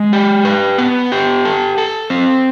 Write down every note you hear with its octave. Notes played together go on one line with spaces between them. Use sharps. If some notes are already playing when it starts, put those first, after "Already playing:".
Already playing: G#3
G4
B4
B3
G4
A4
A4
C4